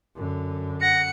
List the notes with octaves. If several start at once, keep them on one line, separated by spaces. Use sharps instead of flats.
F#2 D3
F#5 A#6 C#7